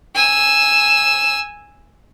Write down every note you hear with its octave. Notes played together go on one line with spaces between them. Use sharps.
G#5 E6